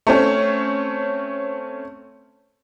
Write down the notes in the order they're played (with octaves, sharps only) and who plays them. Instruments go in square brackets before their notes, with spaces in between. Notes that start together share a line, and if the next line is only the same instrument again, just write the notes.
[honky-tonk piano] A3 C4 C#4